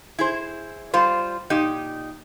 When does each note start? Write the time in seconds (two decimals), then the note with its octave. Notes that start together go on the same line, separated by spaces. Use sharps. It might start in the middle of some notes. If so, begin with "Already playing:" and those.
0.19 E4 G#4 C5
0.94 G3 F4 C5
1.50 A#2 D#4 G4 D#5